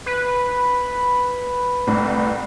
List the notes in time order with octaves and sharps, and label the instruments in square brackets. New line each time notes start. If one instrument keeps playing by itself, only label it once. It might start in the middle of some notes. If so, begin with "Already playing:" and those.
[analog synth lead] B4
[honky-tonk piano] C2 A2